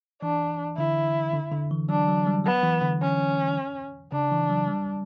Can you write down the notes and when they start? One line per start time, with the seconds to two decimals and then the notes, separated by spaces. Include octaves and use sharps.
0.22 E3 D4
0.77 D3 E4
1.33 D3
1.52 D3
1.71 E3
1.89 F#3 D4
2.08 F#3
2.27 G3
2.45 F#3 B3
2.63 E3
2.82 D3
3.01 C#4
4.12 C#3 D4
4.31 E3
4.50 F#3
4.68 G3